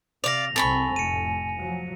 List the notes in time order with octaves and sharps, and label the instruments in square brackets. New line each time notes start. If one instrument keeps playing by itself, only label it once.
[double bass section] C3 [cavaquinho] D5 F5 [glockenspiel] A#6 F7
[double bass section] C2 C4 [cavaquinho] A4 B5 C#6 [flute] G#5
[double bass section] F1 A2 [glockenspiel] C#7 D#7
[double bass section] F3 F#3